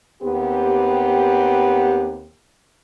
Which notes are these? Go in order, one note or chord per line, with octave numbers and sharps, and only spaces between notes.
D#2 B3 C4 G4